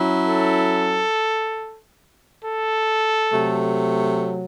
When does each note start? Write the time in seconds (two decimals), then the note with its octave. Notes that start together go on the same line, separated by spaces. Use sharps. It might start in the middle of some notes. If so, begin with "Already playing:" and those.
Already playing: F#3 C#4 E4
0.27 A4
2.44 A4
3.32 C3 F#3 A3